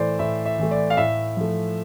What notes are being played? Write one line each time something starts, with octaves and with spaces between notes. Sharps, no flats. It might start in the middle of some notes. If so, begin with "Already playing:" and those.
Already playing: A2 E3 A3 C5 D5
A2 E5
E5
E3 A3
D5
F5
A2 E5
F3 A3